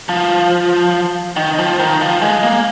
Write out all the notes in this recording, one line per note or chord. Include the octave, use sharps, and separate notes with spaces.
F3
D#3
F3
D#3
F3
G#3
A#3